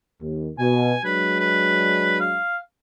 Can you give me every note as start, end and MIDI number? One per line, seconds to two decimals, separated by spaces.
0.21 0.51 39
0.59 0.95 47
0.59 1.02 80
1.05 2.40 54
1.05 2.40 56
1.05 2.40 62
1.05 1.36 71
1.39 2.17 71
2.20 2.57 77